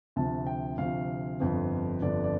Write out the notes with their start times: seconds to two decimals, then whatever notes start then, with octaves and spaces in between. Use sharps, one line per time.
0.16 D2 C3 F3 A5
0.47 G5
0.78 D2 C3 F3 F5
1.40 G1 F2 D3 F3
2.02 G1 F2 D3 F3 D5
2.24 D5